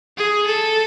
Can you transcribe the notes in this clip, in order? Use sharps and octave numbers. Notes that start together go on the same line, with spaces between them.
G#4
A4